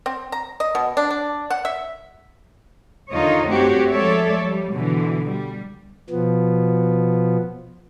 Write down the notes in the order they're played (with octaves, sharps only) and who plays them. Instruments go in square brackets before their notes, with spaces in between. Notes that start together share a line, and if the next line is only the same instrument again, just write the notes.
[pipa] C4
A#5
D#5
B2
D4
D4
F#5
E5
[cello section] D#2 D3 D#4 F4 C#5 D#5
G2 A3 C4 F#4 G4 C#5
F3 G#3 A4 C#5 D5 E5
G3
B2 D3 E3
G3
[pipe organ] B2 F3 B3